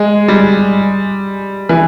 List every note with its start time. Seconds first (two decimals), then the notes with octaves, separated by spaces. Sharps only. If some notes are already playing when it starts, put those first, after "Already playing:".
Already playing: G#3
0.28 G3
1.69 E3